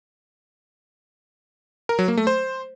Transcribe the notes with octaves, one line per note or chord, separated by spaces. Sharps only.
A#4
F#3
A#3
A3
C5